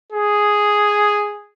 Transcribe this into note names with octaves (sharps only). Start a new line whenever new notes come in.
G#4